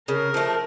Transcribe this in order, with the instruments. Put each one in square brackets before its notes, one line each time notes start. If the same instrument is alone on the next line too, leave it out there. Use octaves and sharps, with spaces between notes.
[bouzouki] C#3 [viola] A#4
[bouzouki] F3 A3